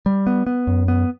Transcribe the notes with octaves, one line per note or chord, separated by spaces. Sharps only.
G3
B3
B3
F#2
B3